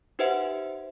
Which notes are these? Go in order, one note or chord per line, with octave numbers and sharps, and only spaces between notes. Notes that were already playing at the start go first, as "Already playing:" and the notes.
D#4 G4 B4 C5 E5 F#5